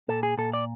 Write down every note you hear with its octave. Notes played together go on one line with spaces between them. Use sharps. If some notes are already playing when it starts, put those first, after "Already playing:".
A#2 A4
G#4
A#2 A4
D5